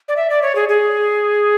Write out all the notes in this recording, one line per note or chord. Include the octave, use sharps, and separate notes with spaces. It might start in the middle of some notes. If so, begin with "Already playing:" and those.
D5
E5
D5
C#5
G#4
G#4